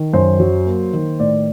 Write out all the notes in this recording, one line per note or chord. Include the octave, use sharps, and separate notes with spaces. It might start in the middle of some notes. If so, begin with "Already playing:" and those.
Already playing: D#3
F#2 C5
F#3
A#3
D#3
A2 D5